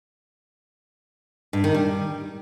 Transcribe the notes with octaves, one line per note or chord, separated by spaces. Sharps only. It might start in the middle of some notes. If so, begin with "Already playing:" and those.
G2
D#3
G3